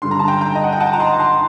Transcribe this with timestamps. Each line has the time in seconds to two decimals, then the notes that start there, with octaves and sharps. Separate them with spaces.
0.02 G2 D3 G3 C6
0.11 A#5
0.19 A5
0.28 G5 A#5
0.41 G5 A#5
0.55 D#5
0.63 F#5
0.72 G5
0.80 F#5 A5
0.93 A#5
1.00 A5 C6
1.19 A5 C6